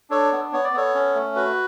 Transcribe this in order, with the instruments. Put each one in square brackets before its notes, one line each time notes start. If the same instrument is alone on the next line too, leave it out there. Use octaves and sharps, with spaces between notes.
[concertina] D4 A4 C#5
B3
B3 C#5
D5
B3 A4 C#5
C#4
A3
F#4 B4